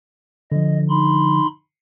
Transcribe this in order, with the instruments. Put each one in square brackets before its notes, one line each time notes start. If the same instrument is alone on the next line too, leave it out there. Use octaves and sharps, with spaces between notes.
[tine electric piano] D3 F3 [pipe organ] D#5
[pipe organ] D#4 B5 C6